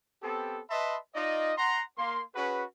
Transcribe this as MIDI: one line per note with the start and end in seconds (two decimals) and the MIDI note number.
0.23 0.61 59
0.23 0.61 60
0.23 0.61 67
0.23 0.61 69
0.70 0.97 71
0.70 0.97 75
0.70 0.97 76
0.70 0.97 81
0.70 0.97 83
0.70 0.97 84
1.15 1.52 63
1.15 1.52 65
1.15 1.52 74
1.15 1.52 75
1.57 1.82 78
1.57 1.82 82
1.57 1.82 84
1.98 2.22 58
1.98 2.22 84
2.35 2.64 61
2.35 2.64 66
2.35 2.64 68
2.35 2.64 71